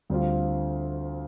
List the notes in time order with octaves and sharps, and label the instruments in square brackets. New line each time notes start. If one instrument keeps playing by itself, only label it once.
[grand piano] D2 D3 G3 C4 F4